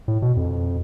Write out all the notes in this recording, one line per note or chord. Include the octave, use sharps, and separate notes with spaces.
A2
B2
F2